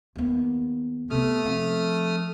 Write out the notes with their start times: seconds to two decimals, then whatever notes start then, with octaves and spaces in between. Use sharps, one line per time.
0.16 D#2 B3
1.10 C3 A3 B3 D#6 F6
1.45 F3 C4